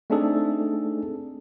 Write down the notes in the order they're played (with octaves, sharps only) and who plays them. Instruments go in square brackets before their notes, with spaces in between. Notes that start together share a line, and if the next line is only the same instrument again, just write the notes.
[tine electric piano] A3 C4 D4 D#4 G#4 A4